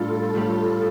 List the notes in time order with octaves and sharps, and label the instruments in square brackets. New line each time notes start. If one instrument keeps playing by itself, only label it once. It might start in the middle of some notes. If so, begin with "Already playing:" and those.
Already playing: [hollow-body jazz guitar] A2 G3 D4 [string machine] F4 A4
[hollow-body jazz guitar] A2 G3